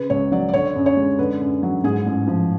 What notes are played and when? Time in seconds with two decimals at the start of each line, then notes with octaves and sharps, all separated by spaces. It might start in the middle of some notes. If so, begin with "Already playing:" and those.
Already playing: C#3 B4
0.10 C#2 C#5
0.32 F#3 D5
0.49 D5
0.53 D3 C#5
0.76 F#2
0.86 C#5
0.97 G#3
1.19 D3 B4
1.41 F#2
1.63 F#3
1.84 G#2 G#4
2.05 A1
2.27 F3